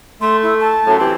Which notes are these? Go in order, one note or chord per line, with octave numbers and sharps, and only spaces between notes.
A3 C6
E4
A5
F#2 A2
E3 C4 G4